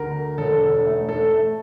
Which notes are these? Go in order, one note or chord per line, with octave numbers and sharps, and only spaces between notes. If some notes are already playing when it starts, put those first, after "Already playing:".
Already playing: D2 A#4
E1 A4
A3
A4
A3